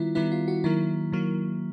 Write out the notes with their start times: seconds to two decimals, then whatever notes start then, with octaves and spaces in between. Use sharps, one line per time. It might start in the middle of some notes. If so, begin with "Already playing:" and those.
Already playing: D#3 G3 B3 E4 F4
0.15 D#3 G3 B3 E4
0.32 F4
0.48 F#4
0.64 D#3 F#3 A#3 E4
1.12 D#3 F#3 A#3